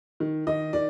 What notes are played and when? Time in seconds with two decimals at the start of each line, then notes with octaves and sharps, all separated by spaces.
0.20 D#3
0.47 D#3 D#5
0.73 D#3 D5